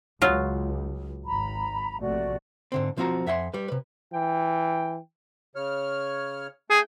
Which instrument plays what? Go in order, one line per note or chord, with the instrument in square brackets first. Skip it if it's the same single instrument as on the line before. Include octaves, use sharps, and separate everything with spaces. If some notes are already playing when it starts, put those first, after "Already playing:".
[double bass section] C#2 [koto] F#3 F4
[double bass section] G#1 [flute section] A#5 B5
[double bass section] A#1 C3 A3 [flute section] F#4 D5
[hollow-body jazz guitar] G#2 D3 C4
B1 F3 C4 F4 F#4 A#5
F2 E5 F#5 G#5 C6
G3 B4
C3 B4
[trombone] E3 [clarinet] G5
[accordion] C#3 C#5 F6
[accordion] A3 G5 G6 [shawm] G#4